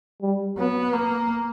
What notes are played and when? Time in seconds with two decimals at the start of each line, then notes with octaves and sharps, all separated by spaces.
0.22 G3
0.57 F#3 B3
0.93 A#3